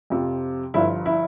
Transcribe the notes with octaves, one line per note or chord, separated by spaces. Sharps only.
F2 C3 F3
G1 G2 F3 E4
E4